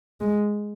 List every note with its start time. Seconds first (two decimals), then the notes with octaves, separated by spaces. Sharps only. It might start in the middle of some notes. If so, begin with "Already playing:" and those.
0.21 G#3